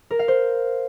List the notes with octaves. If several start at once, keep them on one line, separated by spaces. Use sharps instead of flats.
A#4
F5
C5